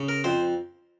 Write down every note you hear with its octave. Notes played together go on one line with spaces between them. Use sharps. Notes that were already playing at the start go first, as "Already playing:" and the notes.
Already playing: C#3
A#4
F2 C5